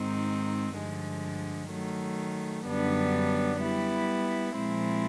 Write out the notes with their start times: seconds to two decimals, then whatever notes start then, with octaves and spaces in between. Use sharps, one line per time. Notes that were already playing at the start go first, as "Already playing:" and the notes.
Already playing: G#2 D#3 G#3 C4 D#4
0.74 G2 D3 F3 G#3
1.70 D#3 F#3 A3
2.66 F#2 D3 G3 B3 D4
3.62 G3 B3 E4
4.57 A#2 F3 G#3 C4 E4